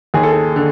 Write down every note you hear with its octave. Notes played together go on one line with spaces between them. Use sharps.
D#2 G#4
A4
G#4
D3